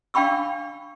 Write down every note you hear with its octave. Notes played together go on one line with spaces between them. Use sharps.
D4 F5 G5 B5 C#6 E6